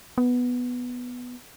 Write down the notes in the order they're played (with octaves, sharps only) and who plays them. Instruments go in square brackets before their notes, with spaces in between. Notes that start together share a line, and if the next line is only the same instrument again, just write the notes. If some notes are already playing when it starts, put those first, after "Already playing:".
[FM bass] B3